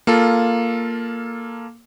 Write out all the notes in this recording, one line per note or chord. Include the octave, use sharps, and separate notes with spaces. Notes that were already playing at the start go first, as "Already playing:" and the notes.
A#3 F4 A4